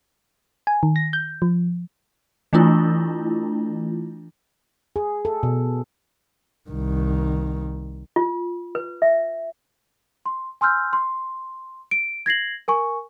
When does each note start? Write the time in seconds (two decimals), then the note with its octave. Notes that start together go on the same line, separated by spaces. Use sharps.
0.67 G#5
0.83 D#3
0.96 A#6
1.13 G6
1.42 F3
2.53 E3 A3 D4 E4 F4
4.96 G#4
5.25 A4
5.43 B2
6.69 C2 D#3
8.16 F4
8.75 B4
9.02 E5
10.26 C6
10.61 G#5 C6 E6 F6 G6
10.93 C6
11.91 D7
12.26 G#6 A#6 C7 F#7
12.68 A#4 G#5 C#6